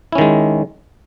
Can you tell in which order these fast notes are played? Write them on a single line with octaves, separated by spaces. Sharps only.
E4 C#4 D#3 G#3